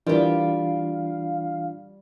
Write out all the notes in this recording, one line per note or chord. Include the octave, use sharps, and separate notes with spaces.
E3 G3 D4 F4 G4 A#4 D5 F5